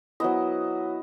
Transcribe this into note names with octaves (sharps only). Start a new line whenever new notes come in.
F#3 B3 E4 D#5